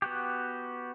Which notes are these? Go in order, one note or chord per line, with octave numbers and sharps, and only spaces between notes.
B3 F#4 G4